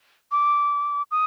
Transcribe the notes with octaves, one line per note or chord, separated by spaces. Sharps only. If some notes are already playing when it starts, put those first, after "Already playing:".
D6
D#6